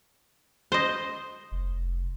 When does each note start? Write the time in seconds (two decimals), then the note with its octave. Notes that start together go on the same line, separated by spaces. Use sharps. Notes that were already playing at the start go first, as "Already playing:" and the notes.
0.72 C5 D#5
1.52 F1